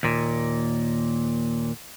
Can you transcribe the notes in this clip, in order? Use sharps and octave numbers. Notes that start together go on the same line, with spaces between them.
D#2 A#2